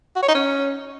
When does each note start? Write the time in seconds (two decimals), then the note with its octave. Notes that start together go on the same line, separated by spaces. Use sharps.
0.16 F#4
0.22 C#5
0.29 D#4
0.35 C#4